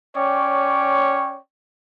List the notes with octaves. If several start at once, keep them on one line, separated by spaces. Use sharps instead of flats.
C#4 C#5 D5 G5